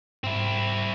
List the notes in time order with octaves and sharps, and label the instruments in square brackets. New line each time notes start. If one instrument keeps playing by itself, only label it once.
[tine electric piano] G#2 [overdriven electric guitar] C4 E4